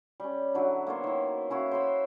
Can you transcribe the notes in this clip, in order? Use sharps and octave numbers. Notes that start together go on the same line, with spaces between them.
G3 C#4
D3 F#3 E4
A#3 B3 C5 C#5
D#3 E4
C#4 E4 F#4 F5
C5 C#5 B5